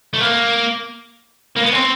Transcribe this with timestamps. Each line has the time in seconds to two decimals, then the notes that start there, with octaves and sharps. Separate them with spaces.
0.13 A3
0.20 A#3
1.56 A#3
1.64 B3
1.73 C4